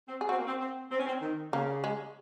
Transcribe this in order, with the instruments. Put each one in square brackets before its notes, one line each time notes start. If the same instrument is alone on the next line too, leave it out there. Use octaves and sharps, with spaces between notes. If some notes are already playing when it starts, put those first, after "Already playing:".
[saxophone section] C4
[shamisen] G#4
[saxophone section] C4 [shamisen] F#4
[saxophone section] A#3
C4
C4
C4
C#4
C4
D#3
[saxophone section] C#3 [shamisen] A#3
[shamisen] G#3